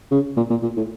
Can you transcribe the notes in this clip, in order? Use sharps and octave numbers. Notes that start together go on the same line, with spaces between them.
C#3
A#2
A#2
A#2
A2